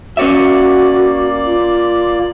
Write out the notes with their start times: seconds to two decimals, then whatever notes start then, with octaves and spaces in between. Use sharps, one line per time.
0.17 A#3 C#4 F#4 C#5 D5 E5
1.45 F4